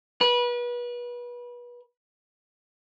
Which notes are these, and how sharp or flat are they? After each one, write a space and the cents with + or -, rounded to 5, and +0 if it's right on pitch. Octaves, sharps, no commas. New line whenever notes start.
B4 -30